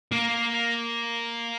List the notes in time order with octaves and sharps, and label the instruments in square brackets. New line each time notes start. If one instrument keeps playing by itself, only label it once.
[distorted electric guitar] A#3